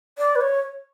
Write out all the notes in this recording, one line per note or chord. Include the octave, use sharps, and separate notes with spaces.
D5
B4
C#5